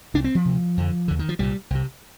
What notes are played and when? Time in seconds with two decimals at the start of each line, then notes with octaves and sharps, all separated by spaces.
0.14 C2 C3 D4
0.24 C4
0.35 F3
0.45 D2 C3
0.77 F2 D3
1.08 D#2 D3
1.19 D#3
1.29 F3
1.39 C2 A#2 G3
1.70 C2 C3